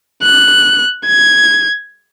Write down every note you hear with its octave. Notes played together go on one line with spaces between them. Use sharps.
F#6
G#6